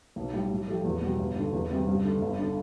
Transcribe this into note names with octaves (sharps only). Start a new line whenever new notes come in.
B1
A2 G3
A2
F3 A3 E4 G4
E2
B2 G3
G1
G2 D3
E2
C3 E3 G3 C4
G2
D3 A3
G1
D3